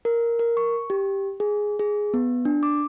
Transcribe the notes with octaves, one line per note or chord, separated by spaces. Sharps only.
A#4
A#4
C#6
G4
G#4
G#4
B3
D4
D6